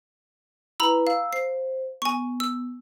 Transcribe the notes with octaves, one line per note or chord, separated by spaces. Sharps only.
E4 B4 A#5 B5 E6
F5 E6
C5 C7
B3 G#5 C#6
E6